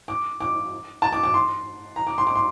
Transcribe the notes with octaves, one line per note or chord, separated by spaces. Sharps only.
D6
D6
A5
D6
D6
C6
A#5
D6
C6
D6
C6